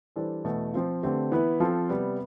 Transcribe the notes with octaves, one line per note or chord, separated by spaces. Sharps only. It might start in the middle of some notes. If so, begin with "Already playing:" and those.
E3 G3 D4 A4 C5
E2 B2 A3
F3 C4 F4
D3 A3 C4 G4 B4
E3 B3 E4 B4
F3 C4 F4 A4
C3 G3 B3